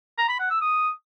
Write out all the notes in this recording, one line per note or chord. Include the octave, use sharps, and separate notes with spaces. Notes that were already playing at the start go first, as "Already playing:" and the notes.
A#5
B5
F#5
E6
D#6